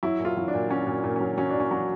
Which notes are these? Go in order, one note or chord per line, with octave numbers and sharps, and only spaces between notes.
F#3 E4
A#2
F4
F#3
D4
A#2
F#3 C#4
A#2
A#2
F#3 C#4
F#3 C#4
A#2 D4
C#4
F#3